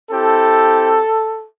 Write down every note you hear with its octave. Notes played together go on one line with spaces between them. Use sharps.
C4 E4 G4 A4